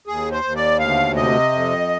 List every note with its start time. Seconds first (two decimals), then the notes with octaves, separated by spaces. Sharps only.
0.07 D#2 G#4
0.32 C5
0.44 D#2
0.56 D5
0.79 D2 F5
1.16 C3 D#5
1.52 F2